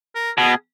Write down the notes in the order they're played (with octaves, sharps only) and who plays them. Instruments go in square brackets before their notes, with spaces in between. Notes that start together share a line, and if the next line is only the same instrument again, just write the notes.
[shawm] A#4
[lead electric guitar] B2 [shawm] G#4